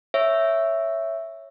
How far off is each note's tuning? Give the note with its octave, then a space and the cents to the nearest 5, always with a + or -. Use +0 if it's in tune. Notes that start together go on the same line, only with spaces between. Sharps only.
C#5 +0 E5 +0